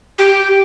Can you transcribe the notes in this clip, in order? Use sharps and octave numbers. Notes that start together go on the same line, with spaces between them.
G4